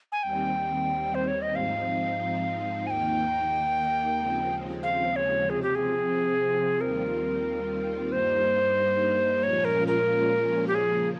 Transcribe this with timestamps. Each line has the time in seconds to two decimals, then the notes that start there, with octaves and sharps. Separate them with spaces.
0.12 G#5
0.23 D#2 D#3 G3 C4 G5
1.15 C5
1.28 C#5
1.42 D#5
1.55 G#2 F3 C4 D#4 F5
2.86 D#2 D#3 A#3 D#4 G5 G#5
4.17 D#2 C#3 F3 G#3 C4
4.83 F5
5.16 C#5
5.49 C3 F3 C4 G#4
5.62 G4
5.75 G#4
6.80 D#2 D#3 G3 C4 F4 A#4
8.11 G2 G3 A#3 D#4 C5
9.43 A#2 F3 G#3 C#4 F4 C#5
9.65 A#4
9.87 A#4
10.67 G4
10.74 C#3 F3 A#3 G#4